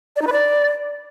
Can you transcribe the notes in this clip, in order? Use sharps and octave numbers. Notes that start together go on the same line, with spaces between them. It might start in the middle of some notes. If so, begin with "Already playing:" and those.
D5
D#4
B4
D5